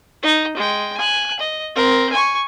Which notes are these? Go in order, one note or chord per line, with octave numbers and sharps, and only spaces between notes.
D#4
G#3 G5
G#5 F#6
D#5
C4 A#4
G#5 C#6